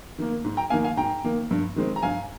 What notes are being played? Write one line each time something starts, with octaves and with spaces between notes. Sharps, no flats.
D#3 A#3
G#2
G5 A#5
D#3 A#3 F5 G#5
F5 G#5
G#2 G5 A#5
D#3 A#3
G2
D#3 G#3 C4
A#5
G2 F5 G#5